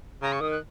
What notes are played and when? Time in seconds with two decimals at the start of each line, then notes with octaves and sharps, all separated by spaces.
0.22 C#3 A#5
0.32 C#6
0.41 D#3 D#6
0.51 F#6